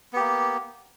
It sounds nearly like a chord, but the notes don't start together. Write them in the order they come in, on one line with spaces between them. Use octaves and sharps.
B3 G4 A#3